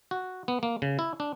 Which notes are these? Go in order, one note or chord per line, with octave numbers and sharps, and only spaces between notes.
F#4
B3
A#3
C#3
E4
D4